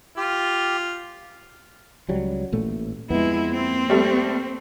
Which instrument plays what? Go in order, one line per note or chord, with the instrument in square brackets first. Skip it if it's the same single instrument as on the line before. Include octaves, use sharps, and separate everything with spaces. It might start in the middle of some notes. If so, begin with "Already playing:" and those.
[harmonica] F4 [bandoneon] G4
[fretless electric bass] C#2 F#3 G3
A1 A#2 A3
[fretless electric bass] F2 B3 [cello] G#3 E4
[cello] A#3 C4
[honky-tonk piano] G3 A3